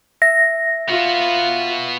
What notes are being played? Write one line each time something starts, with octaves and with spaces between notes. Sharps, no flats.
E5 A#6
B3 F4 F#4